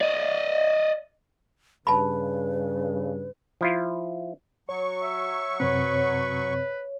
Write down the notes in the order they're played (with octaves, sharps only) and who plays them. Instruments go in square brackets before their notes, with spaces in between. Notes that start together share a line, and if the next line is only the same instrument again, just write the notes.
[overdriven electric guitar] D5 D#5
[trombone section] G2 C#3 [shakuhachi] B4 [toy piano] A5 B5
[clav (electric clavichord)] F3 E4 F4
[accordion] F#3 C#6 [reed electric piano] C#5
[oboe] E5
[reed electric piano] F#2 C3 C4 [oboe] B4 [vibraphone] C#5